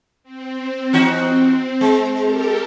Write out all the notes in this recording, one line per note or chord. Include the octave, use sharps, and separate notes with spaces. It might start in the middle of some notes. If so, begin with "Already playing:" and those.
C4
E3 D#4 F#4
G#3
G4 A4 A#4